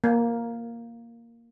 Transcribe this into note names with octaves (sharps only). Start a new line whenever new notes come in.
A#3